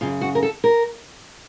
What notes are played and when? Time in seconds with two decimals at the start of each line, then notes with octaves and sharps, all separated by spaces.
0.01 F#2 C#3 F4
0.21 F#4
0.35 A#4
0.43 A4
0.64 A#4